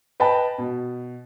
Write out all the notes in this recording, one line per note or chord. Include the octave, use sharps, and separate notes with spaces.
B4 D#5 G5 A5 B5
B2